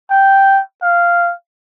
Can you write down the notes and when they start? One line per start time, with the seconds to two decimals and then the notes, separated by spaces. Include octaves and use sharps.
0.10 G5
0.82 F5